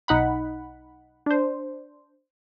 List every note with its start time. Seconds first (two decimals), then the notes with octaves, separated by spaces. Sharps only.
0.08 B1 D#4 F#5 B5
1.26 D4 C5